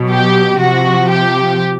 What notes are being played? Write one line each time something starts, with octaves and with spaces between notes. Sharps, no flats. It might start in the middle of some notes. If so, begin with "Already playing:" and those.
Already playing: B2 F#3
G4
C3 F3 F#4
G4